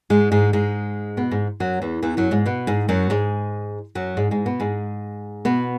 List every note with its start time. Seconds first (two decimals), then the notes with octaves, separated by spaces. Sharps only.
0.10 G#2 G#3
0.32 G#2 G#3
0.53 G#2 G#3
1.17 B2 B3
1.31 G#2 G#3
1.60 F#2 F#3
1.82 E2 E3
2.03 E2 E3
2.17 F#2 F#3
2.31 G#2 G#3
2.46 B2 B3
2.67 G#2 G#3
2.89 F#2 F#3
3.10 G#2 G#3
3.95 F#2 F#3
4.17 G#2 G#3
4.31 G#2 G#3
4.46 B2 B3
4.60 G#2 G#3
5.45 B2 B3